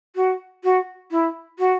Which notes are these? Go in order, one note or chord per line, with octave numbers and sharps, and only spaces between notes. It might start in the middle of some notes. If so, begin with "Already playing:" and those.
F#4
F#4
E4
F#4